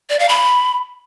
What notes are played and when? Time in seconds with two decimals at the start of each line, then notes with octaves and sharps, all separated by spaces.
0.10 D5
0.19 F5
0.29 B5